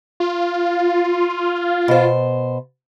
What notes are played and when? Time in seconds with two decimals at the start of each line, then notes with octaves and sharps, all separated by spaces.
0.20 F4
1.88 B2 C5